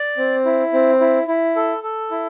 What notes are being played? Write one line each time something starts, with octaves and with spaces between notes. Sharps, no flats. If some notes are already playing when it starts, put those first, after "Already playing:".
Already playing: D5
C4
E4
C4
E4
E4
A4
A4
E4